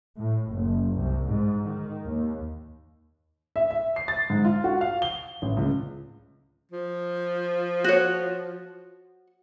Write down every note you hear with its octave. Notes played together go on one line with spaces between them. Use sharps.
A2
F#1
C2
G#2
D#3
D#2
E5
E5
C7
A6
G#2
F4
F#4
F5
G7
A1
C#2
F3
F#4 C#5